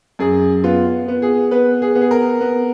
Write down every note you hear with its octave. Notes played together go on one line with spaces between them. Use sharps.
F#2 G#4
B3 F4
B3
G#4
B3 B4
G#4
B3
G#4
A#4
B3